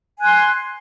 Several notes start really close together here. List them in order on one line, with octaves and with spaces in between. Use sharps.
G#5 F#6 C6